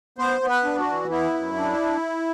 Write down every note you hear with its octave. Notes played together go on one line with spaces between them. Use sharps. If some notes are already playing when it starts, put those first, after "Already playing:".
B3 C5
B3
B4
D4
F#4
E3
B3 E4
F#2
D4